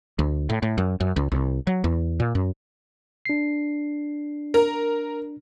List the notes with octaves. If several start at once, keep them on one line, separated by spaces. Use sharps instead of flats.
D2
A2
A2
F#2
F#2
C#2
C2
F#3
E2
A#2
F#2
D4 C7
A#4